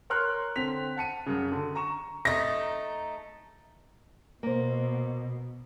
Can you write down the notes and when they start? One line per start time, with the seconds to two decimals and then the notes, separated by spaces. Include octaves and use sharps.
0.10 A#4 C#5 C6 F6 F#6
0.56 D3 C4 B6 F7
0.97 F#5 A5 C#7 D#7
1.26 F#2 C#3
1.52 D3
1.75 A#5 C#6 E7
2.25 A3 D#4 A#6
4.43 B2 A#3 C5